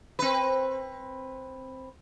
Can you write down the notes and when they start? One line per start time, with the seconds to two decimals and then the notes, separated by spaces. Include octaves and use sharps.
0.19 C4 B4